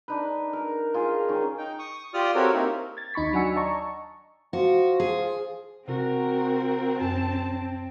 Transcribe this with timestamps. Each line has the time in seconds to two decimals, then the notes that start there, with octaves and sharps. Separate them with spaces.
0.08 D4 D#4 B4
0.53 A#4
0.94 F4 G#4
1.29 D#3 C#4
1.58 D#4 G5
1.79 C#6 D#6
2.14 F4 G4 D5 D#6 F6
2.35 C4 F#4 G4 A4 A#4 C#5
2.53 A#3 C4 D#4 E4 A#4
2.97 G#6 A6
3.14 D#2 D#4 B5 C#6 B6
3.33 F#3 D4 F#5 G#5 E6 C#7
3.56 D5 D#5 A5 A#5 C#6
4.53 F3 F#4
5.00 G#4
5.88 C3 C4 F#4 A#4
7.01 F#2 C#4 G#5 A5